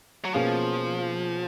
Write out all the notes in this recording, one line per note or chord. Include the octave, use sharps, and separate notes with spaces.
F#3
B2 F3 A#3 C#4 F4 G#4